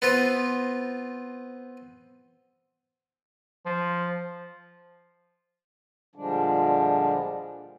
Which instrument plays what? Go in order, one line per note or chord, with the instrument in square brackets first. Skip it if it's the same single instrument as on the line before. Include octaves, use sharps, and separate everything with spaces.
[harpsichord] B3 C4 F4
[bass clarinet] F3
[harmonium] A#2 D3 F3 G3 G#3 D4